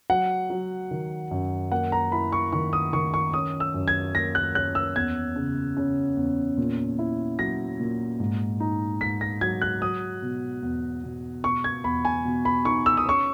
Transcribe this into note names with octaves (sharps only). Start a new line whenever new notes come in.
F#3 F#5
F#3
D#3
F#2
A#3 F#5
A#5
E4 B5
C#6
D#3 C#6
D#6
D#3 C#6
C#6
C#4 D#6
E6
F#2
G#6
A#3 A#6
F#6
C#4 F#6
E6
E2 G#6
C#3
C#3
E2
A#2
E4
F#3 A#6
A#2
G#2
D#4
G#2 B6
A#6
F#3 G#6
F#6
F#3 D#6
B2
E2
B2
B2 C#6
G#6
E2 B5
G#5
B2
B5
D#4 C#6
E6
D#6
C#4 C#6